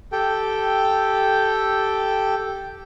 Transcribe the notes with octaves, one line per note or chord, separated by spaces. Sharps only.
G4 A4 G5